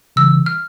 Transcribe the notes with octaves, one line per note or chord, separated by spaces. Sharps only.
C#3 E3 G3 E6
F6